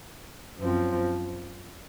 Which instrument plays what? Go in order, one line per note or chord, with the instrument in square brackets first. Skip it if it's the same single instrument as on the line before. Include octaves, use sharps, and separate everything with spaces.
[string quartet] F#2 F3 C4